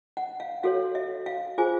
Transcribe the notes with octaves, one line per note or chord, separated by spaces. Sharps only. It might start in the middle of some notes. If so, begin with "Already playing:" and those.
F#5
F5
F#4 A4 C#5 F5
E5
F5
F4 G#4 C5 G#5